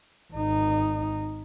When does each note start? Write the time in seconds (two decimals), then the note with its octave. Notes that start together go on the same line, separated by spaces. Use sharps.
0.33 G#1 D#4